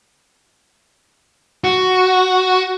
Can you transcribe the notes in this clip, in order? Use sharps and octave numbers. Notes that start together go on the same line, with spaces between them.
F#4